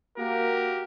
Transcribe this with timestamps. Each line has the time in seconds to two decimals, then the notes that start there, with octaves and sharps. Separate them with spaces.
0.18 A#3 F#4 G4 A#4